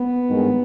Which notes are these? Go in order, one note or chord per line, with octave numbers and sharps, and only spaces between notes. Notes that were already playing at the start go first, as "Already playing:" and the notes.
Already playing: B3
G#1 G2 D#3 G#3